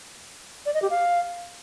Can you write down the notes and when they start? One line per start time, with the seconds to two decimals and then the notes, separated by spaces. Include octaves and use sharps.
0.66 D5
0.74 D#5
0.82 G4
0.90 F5